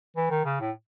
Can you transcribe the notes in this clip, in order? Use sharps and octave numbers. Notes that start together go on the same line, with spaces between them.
E3
D#3
C#3
A2